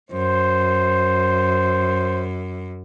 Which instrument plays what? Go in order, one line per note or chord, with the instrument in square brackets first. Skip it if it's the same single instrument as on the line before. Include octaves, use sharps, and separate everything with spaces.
[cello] F#2 [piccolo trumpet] C5